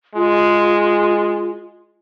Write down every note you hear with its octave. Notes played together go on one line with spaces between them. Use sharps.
G#3 F4